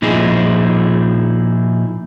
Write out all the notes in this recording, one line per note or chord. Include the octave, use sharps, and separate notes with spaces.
A#2 F3 D#4 E4 G#4